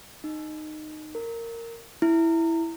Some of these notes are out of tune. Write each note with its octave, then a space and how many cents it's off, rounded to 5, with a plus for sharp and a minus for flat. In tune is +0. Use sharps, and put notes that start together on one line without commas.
D#4 -15
A#4 -15
E4 +0